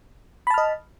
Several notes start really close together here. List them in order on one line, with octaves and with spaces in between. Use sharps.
B5 A5 F6 D#5